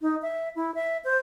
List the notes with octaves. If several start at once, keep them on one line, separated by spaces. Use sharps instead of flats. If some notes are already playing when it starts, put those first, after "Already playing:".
D#4
E5
E4
E5
C5